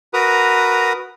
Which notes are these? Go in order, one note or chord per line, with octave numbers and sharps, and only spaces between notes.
F#4 A#4 B4 A#5 D#6